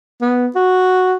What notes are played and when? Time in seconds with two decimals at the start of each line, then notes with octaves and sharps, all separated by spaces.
0.21 B3
0.55 F#4